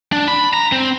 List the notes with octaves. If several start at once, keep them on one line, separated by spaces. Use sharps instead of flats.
D4
B5
A#5
C4